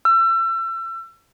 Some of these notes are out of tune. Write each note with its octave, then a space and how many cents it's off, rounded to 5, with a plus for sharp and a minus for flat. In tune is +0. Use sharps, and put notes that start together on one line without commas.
E6 +35